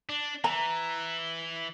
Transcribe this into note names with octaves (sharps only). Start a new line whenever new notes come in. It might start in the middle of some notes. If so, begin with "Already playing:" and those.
D4
E3 A#5